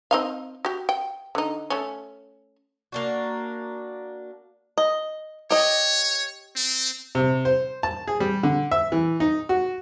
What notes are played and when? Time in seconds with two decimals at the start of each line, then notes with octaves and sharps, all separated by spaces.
0.11 C4 D#4 F5
0.65 F#4 G4
0.89 G5
1.35 D3 D#4
1.70 A3 C#4
2.92 A#3 D4 F#4
4.78 D#5
5.51 G4 C#5 D#5
6.56 C4
7.15 C3
7.45 C5
7.83 A5
8.08 G#4
8.20 G3
8.43 D3
8.71 E5
8.92 E3
9.20 D#4
9.49 F#4